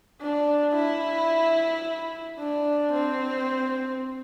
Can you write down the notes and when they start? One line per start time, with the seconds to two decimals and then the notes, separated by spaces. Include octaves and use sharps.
0.21 D4
0.75 E4
2.39 D4
2.93 C4